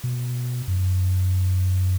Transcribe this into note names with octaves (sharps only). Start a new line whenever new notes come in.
B2
F#2